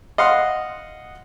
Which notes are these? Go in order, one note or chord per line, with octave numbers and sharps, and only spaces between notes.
D#5 F5 F#5 C6